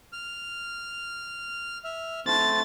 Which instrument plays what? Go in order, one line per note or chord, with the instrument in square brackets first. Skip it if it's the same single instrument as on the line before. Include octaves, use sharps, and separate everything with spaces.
[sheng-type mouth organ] F6
E5 F6
[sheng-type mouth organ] A3 C4 [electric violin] A6